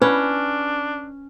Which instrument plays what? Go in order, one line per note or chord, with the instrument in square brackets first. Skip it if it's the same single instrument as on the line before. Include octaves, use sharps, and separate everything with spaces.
[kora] C#4 [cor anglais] D4 [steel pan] B4